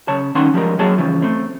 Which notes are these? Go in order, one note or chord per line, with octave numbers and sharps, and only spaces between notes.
C#3 C#5 A5
G2 D#3 C#4 F#5 G#5 C6
F3 G3 G#3 A#4
F#3 A#3 G#4 C#5 A5
G2 C#3 E3 F3
A3 C4